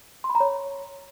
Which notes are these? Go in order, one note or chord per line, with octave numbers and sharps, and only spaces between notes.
C6
B5
A#5
C#5